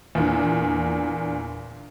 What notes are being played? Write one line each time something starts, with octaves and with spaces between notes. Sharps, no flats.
E2 A#2 D3